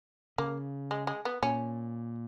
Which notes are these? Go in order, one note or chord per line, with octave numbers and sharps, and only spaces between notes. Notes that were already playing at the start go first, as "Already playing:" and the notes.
C#3 A#3
G#3
G#3
B3
A#2 C#4